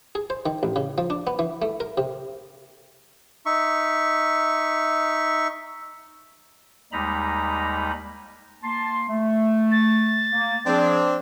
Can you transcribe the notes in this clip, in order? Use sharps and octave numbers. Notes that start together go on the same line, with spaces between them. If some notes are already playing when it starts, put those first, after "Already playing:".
G#4
C5
D#3
A1
C#3
F3
D4
B3
E3
A3
A#4
C3
D#4 E5 C#6
D#2 G3 G#3 D#4 A#5 B5
A#3 A5 C6
A3
A6
A#3
F3 C4 D4 G#4